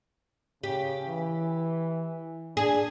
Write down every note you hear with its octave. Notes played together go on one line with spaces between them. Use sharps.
C#3 G4
E3
D4 G#4